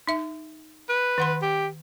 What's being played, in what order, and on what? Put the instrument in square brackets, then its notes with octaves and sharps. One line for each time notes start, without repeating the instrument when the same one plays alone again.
[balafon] D#4 E5
[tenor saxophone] B4
[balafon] D#3 F#5 C6
[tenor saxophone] G4